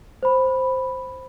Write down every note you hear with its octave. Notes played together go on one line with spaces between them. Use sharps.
C5 B5